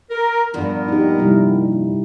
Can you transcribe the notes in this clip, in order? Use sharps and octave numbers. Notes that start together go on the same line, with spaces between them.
A#4
G2 A#2 F3 B3 A#4
D#4 G4
C3 G3 E4